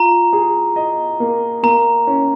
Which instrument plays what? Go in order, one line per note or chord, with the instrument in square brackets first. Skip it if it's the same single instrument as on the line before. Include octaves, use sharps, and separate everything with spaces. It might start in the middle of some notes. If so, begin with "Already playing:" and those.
Already playing: [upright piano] F4 [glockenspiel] A#5
[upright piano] G#4
D#5
A#3
[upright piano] A#3 [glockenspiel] A#5
[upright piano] C#4